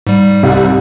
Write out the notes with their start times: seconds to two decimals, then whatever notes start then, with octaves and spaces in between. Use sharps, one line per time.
0.07 G#2 G3
0.43 C2